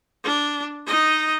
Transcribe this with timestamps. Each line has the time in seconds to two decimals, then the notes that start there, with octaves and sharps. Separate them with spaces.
0.24 D4
0.86 D#4 D#5